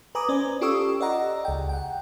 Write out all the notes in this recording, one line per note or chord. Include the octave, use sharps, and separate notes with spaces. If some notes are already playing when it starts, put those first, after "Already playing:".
B4 G#5 A#5 D6 D#6
C#4 C5 D5
F4 G4 A4 C#6 D#6 E6
D5 D#5 F#5 A#5
C#2 G5
F#5 G5